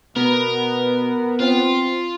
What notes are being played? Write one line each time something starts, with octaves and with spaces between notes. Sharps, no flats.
B2 B3 A#4
C4 F4